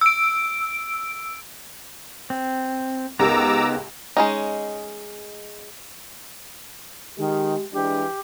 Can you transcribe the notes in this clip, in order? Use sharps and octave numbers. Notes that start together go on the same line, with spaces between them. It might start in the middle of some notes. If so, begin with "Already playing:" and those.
E6 D7
C4
C#2 B3 D#4 G4 A#4 A#5 D6 E6
G#3 C#4 D#4
D#3 G#3 G4
E3 G#3 D4 G4